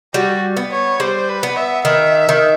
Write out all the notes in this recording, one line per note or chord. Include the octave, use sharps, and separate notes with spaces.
G3 F#4
B3
C#5
G3 C5
B4
B3
E5
D#3 E5
D#3